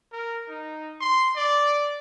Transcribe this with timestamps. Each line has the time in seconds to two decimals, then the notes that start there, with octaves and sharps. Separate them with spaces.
0.12 A#4
0.49 D#4
1.00 C6
1.36 D5